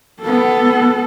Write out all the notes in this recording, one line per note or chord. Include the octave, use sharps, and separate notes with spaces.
B3 A4